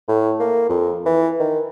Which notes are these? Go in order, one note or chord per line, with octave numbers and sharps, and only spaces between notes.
A2
A#3
F2
E3
D#3